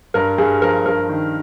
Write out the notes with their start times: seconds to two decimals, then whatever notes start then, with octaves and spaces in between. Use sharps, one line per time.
0.14 G2 A#4
0.38 G2 G#4
0.62 F3 A#4
0.86 G2 A#4
1.09 D#3